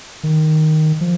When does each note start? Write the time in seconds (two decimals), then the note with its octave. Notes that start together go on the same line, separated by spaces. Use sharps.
0.23 D#3
1.01 F3